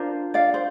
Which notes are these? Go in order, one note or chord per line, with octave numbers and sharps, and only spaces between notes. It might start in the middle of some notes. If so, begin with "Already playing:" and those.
Already playing: D4 F4 A#4 C5
D5 F5
C5